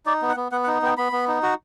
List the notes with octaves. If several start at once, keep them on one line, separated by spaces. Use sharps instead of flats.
D#4 D5
B3
F#5
B3
B3 F#5
F#5
D#4
B3 G5
B3 B5
B3
D#4
F#4